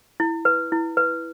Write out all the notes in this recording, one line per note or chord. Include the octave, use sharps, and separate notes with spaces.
E4
B4
E4
B4